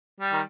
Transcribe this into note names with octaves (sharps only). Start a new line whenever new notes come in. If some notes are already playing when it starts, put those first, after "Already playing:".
G3
D#3